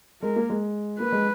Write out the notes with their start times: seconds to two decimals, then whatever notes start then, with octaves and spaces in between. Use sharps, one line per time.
0.22 G#3 A#4
0.36 A#3
0.50 G#3
1.00 A#3 B4
1.12 G#3